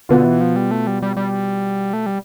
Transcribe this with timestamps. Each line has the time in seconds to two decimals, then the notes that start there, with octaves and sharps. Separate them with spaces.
0.09 B2 D3 B3 F4
0.25 E3
0.41 F3
0.56 G3
0.71 A3
0.87 G3
1.02 G3
1.17 G3
1.93 A3
2.06 G3